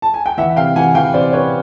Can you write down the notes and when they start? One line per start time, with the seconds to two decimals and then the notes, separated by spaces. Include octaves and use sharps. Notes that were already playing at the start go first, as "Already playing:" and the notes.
0.02 A5
0.14 G#5
0.26 G5
0.38 E3 E5 F#5
0.56 C3 F5 G5
0.75 E3 F#5 G#5
0.95 E3 F5 G5
1.14 C3 C5 D5
1.33 C#4 B4 C#5